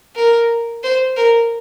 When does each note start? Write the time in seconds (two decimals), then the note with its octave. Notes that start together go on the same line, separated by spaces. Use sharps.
0.16 A#4
0.83 C5
1.16 A#4